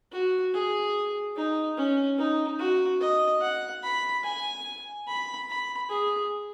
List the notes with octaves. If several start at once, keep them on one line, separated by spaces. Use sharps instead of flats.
F#4
G#4
D#4
C#4
D#4
F#4
D#5
F#5
B5
G#5
B5
B5
G#4